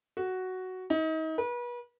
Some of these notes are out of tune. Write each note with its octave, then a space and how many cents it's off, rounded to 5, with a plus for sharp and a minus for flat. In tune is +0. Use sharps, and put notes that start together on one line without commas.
F#4 +5
D#4 +35
B4 -35